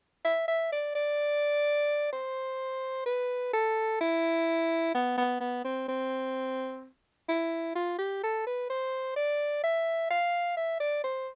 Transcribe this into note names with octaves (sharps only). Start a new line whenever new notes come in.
E5
E5
D5
D5
C5
B4
A4
E4
B3
B3
B3
C4
C4
E4
F4
G4
A4
B4
C5
D5
E5
F5
E5
D5
C5